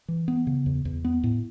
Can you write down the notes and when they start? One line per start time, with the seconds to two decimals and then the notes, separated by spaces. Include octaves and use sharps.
0.08 E3
0.28 B3
0.47 C#3
0.66 E2
0.85 E2
1.05 B3
1.24 A2